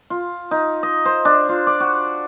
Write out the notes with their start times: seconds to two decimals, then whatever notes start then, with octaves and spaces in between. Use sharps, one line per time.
0.10 F4
0.51 D#4
0.83 D#5
1.05 C5
1.25 D4
1.49 F4
1.67 D5
1.80 F#4